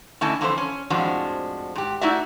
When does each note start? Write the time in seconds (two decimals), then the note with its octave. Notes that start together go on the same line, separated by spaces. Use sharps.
0.21 D3 A3 C#4 E4 D#5 A5
0.41 F2 D3 E3 A3 A4 C5
0.58 C#4
0.90 F2 A2 F3 G#3 D4 F#4
1.75 G#2 G4
2.01 A3 D#4 E4 F#4 D5 E5